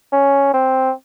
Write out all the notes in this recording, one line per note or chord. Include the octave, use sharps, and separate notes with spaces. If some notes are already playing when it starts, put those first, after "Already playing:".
C#4
C4